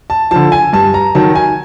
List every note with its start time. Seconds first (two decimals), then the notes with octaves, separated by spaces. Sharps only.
0.10 A5
0.31 D3 F3 A5
0.52 G#5
0.73 G2 A5
0.94 A#5
1.15 D#3 F#3 A5
1.35 G#5